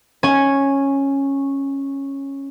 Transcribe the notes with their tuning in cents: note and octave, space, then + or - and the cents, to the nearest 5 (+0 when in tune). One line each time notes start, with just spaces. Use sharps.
C#4 -10 G#5 +0